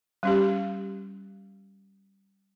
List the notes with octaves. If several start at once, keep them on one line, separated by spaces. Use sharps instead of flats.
G3 C#4 G4